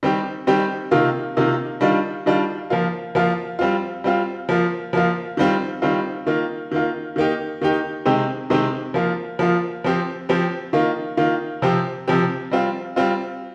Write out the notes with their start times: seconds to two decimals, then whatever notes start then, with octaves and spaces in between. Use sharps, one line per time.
0.03 D#3 G3 C4 G4
0.47 D#3 G3 C4 G4
0.91 C3 D#3 A#3 F4
1.37 C3 D#3 A#3 F4
1.81 D#3 G3 D4 F4
2.26 D#3 G3 D4 F4
2.70 F3 A#3 F4
3.15 F3 A#3 F4
3.59 G3 C4 F4
4.04 G3 C4 F4
4.49 F3 A#3 F4
4.93 F3 A#3 F4
5.37 D#3 G3 C4 F4
5.82 D#3 G3 C4 F4
6.26 D#3 A#3 F4
6.71 D#3 A#3 F4
7.16 D#3 A#3 D#4 G4
7.61 D#3 A#3 D#4 G4
8.05 C3 D#3 G#3 C4 G4
8.50 C3 D#3 G#3 C4 G4
8.94 F3 A#3 F4
9.39 F3 A#3 F4
9.84 F3 C4 G4
10.29 F3 C4 G4
10.73 D#3 A#3 F4
11.17 D#3 A#3 F4
11.62 C3 F3 C4 G4
12.07 C3 F3 C4 G4
12.51 G3 C4 F4
12.96 G3 C4 F4